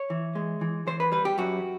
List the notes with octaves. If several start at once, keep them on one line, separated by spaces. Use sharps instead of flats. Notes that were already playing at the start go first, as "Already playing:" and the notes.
Already playing: C#5
E3
G#3
E3
E3 C5
B4
G3 B4
G4
F#2 F#4